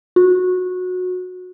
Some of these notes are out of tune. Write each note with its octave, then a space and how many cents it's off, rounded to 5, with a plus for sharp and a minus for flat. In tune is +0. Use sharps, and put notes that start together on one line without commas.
F#4 -20